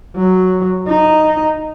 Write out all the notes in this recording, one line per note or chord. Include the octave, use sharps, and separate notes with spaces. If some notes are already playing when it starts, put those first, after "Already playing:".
F#3
D#4